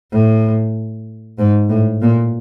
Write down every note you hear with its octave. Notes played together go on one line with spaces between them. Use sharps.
A2
G#2
A2
A#2